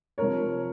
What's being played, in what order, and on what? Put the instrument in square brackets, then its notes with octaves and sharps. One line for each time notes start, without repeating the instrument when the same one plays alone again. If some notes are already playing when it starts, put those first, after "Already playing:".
[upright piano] C3 F3 A#4 C#5